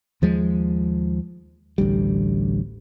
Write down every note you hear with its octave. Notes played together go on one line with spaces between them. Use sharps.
D#2 F3 G#3
A1 D2 G3